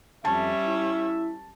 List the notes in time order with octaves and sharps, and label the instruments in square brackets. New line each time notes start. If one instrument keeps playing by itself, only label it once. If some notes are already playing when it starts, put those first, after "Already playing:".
[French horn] F2 [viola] G3 C#4 [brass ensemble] E5 [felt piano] A5
[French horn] E4